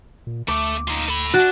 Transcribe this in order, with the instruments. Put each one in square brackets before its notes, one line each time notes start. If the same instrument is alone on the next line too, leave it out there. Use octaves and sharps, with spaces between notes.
[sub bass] A#2
[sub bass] D2 [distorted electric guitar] A3 [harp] D6
[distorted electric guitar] D#4 F4
A4 B5
[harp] F#4 [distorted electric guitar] D5 A5